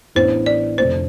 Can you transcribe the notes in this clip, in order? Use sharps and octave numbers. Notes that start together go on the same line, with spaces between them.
A1 A2 E3 B3 D4 C5
D5
F1 F2 D3 A3 D4 C5